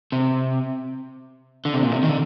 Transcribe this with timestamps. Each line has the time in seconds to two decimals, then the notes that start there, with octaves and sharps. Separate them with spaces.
0.12 C3
1.65 D3
1.73 C3
1.83 A#2
1.92 C3
2.03 D#3
2.09 D3